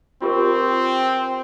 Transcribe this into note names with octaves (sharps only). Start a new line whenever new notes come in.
C4 F4 G4 A#4